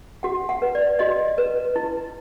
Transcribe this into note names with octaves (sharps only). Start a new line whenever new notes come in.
F#4 F#5
F#5
B4
D5
F#4 D#5
B4
E4